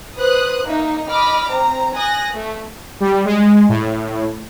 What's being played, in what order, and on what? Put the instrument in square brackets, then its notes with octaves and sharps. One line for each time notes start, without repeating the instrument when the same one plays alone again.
[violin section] B4 C5 D#6 F#6
A#3 D#4 E5
D#5 B5 D6 F6
C4 A#5
G#5 D#6 F#6 A#6
A3
[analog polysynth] G3
G#3
A2